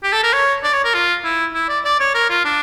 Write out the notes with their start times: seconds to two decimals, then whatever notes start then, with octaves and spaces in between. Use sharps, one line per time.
0.04 G4
0.13 A4
0.23 A#4
0.33 C#5
0.63 D5
0.73 C#5
0.84 A#4
0.94 F4
1.24 E4
1.54 E4
1.69 D5
1.85 D5
2.00 C#5
2.15 A#4
2.30 F4
2.45 D4